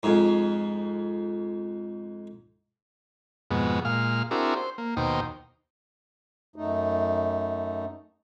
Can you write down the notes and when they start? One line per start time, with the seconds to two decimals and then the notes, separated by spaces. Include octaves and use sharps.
0.03 F2 G#2
3.51 F2 G#2 B2 G#3 B3
3.85 A#2 G#3 F5 F6
4.31 C4 D4 E4 F#4 G#4 A#4
4.56 C5
4.78 A#3
4.97 D#2 B2 D#4 C5 G5 A#5
6.56 F#2 A3 D#4